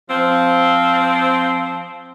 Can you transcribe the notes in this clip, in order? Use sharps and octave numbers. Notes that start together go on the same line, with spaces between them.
F3 C4